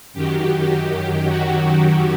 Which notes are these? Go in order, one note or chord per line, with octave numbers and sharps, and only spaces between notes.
F#2 D#3 F#3 G4
F#4
G4